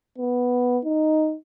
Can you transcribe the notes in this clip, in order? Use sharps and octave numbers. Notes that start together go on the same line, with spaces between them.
B3
D#4